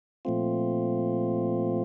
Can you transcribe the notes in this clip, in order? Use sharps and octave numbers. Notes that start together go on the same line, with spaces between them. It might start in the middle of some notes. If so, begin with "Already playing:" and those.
A#2 F3 A3 C4 F4